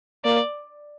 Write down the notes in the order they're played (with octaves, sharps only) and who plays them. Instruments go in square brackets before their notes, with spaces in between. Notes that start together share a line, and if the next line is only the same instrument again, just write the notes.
[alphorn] A#3 [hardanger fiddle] D5